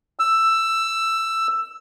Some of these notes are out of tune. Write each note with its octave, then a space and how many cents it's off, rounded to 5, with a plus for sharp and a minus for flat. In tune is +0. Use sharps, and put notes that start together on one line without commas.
E6 +10